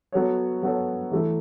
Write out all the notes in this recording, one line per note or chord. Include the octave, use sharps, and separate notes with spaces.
F#3 B3 F#4 A4 C#5
F#3 B3 F#4 A4 C#5
E3 A3 E4